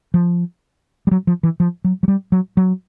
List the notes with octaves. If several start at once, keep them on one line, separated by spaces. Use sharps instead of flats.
F3
G3
F#3
F3
E3
F3
F#3
F#3
G3
F#3
F#3